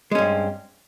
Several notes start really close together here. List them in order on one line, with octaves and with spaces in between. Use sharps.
G#3 C#4 G2 C4